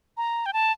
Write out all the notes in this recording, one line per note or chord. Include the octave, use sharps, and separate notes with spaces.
A#5
G5
A5